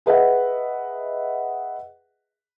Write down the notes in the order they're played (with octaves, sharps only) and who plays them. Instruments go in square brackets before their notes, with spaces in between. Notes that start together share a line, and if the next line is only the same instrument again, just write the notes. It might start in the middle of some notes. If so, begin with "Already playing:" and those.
[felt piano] G#4 B4 D#5 E5 F#5